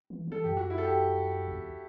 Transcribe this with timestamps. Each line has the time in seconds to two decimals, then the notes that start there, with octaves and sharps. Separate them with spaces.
0.10 E3
0.27 E3 A4
0.44 F#2 G4
0.57 F#4
0.70 E4
0.78 A4
0.83 G4
1.48 E2